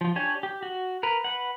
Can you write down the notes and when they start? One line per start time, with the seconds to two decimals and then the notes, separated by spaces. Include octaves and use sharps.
0.01 F3 F4
0.16 D4 G4 C#5 G#5
0.43 G4
0.63 F#4
1.03 A#4 B4
1.24 B4 F#5